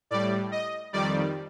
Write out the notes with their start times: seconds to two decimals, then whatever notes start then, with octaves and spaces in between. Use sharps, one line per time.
0.11 A2 G3 D5
0.52 D#5
0.93 F2 D#3 G3 D5